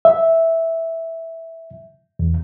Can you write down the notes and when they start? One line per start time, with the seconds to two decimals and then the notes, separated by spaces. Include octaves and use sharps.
0.05 E5
2.19 E2